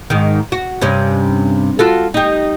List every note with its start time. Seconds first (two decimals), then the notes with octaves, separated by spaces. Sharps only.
0.10 G#2 D#3
0.52 F#4
0.81 G2 C3 C#4
1.79 F4 F#4 A4
2.14 D#4 G4